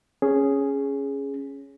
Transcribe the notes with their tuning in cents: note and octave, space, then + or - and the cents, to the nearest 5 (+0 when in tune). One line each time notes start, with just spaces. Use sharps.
C#4 +0 G#4 +0